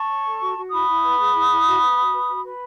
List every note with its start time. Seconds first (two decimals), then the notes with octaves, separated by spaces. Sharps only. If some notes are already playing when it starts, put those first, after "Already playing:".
Already playing: A5 C#6
0.08 C#5
0.25 A4
0.39 F#4
0.56 F#4
0.71 E4 B5 D#6
0.86 E4
1.02 B4
1.19 G#4
1.34 E4
1.49 E4
1.65 F#4
1.81 B4
1.97 F#4
2.12 B4
2.28 F#4
2.43 B4